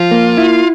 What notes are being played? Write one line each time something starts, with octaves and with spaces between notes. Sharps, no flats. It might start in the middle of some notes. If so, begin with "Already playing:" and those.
Already playing: F3 F4
A#3
E4